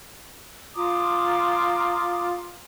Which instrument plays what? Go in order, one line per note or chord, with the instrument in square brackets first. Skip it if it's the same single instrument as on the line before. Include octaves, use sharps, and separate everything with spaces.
[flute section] F4 A#5 D6 D#6